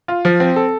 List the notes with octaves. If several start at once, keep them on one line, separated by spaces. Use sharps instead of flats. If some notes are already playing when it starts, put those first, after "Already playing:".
F4
F3
C4
A4